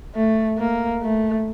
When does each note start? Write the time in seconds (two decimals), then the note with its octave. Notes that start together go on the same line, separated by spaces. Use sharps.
0.15 A3
0.58 A#3
1.02 A3